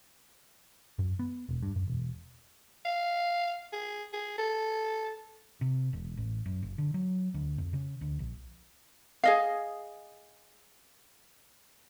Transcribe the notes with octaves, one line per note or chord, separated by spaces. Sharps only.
F#2
B3
E1
G2
F#2
E1
F5
G#4
G#4
A4
C3
E1
A1
F#2
F#1
D3
F#3
D2
F2
C#3
D2
A#1
G#4 D#5 F5